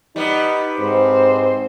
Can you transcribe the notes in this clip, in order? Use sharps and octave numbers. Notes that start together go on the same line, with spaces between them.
G3 B3 D#4
G#2 C4 C5